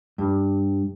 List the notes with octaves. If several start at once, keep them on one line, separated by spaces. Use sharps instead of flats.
G2